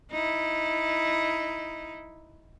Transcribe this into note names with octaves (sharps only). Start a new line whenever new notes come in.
D#4 E4